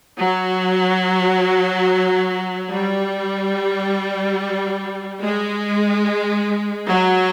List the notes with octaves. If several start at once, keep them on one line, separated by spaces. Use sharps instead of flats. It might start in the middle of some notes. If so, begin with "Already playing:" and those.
F#3
G3
G#3
F#3